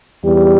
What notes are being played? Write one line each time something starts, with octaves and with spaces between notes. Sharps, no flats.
E2 G3